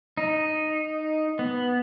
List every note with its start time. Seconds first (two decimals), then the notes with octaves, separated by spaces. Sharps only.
0.17 D#4
1.39 B3